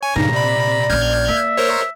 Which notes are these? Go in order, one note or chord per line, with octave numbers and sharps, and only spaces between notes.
C#5 G#5
G2 A#2 C#3 D#4 A#5
C3 D5 B5
A#1 C#4 F6 G6 G#6
A#3 E5
A#4 C5 C#5